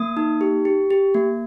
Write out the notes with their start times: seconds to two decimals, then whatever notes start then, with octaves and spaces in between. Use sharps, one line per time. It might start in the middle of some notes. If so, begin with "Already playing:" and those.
Already playing: A#3 D#6
0.17 D#4
0.41 G4
0.65 G4
0.91 G4
1.14 A#3